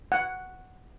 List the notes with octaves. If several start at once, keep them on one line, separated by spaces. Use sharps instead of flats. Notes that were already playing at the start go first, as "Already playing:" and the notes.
F#5